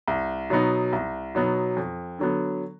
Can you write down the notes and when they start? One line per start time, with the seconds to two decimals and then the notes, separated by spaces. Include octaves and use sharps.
0.08 C2
0.50 B2 F#3 B3 D#4
0.93 C2
1.35 B2 F#3 B3 D#4
1.77 F2
2.19 D3 F#3 B3